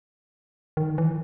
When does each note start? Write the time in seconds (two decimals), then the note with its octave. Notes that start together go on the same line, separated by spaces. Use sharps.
0.77 D#3
0.98 E3